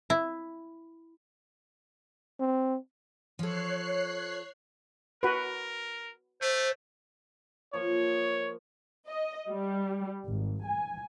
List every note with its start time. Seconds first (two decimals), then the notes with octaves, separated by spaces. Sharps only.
0.10 E4
2.40 C4
3.39 F3 A4 C#5 F#6 C7
5.23 F#4 A#4 B4
6.42 A3 C5
7.73 F3 A#3 C#5
9.08 D#5
9.49 G3
10.28 G#1
10.66 G#5